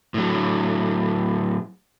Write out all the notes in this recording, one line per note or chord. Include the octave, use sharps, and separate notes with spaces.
A2 F#3